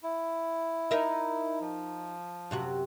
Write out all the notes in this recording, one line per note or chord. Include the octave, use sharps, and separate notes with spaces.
E4
D#4 A#4 E5
F3
F#2 C3 F#4